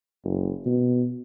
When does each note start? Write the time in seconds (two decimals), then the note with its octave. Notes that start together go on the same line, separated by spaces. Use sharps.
0.24 F#1
0.66 B2